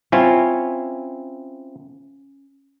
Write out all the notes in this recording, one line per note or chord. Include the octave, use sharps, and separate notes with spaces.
C4 C#4 E4 F4 C#5